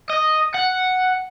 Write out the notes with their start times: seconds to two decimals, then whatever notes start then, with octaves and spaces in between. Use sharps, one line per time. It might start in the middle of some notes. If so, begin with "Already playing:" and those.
0.10 D#5
0.55 F#5